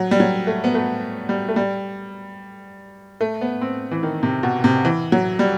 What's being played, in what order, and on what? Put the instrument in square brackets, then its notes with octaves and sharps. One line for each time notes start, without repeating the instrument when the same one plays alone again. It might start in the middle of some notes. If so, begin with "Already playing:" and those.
Already playing: [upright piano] F#3
G3
F#3
A3
B3
A3
G3
A3
G3
A3
B3
C4
E3
D#3
C3
B2
C3
E3
F#3
G3